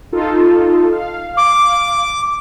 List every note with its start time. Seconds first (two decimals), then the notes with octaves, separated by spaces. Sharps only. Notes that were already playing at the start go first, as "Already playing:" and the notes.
0.12 D#4 F4 A4
0.92 F5
1.37 D6